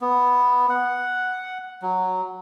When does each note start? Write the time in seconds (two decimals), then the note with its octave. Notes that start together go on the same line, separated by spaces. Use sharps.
0.01 B3
0.69 F#5
1.82 F#3